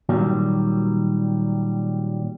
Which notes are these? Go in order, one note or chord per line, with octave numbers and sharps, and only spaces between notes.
A#2 D#3 F#3 G3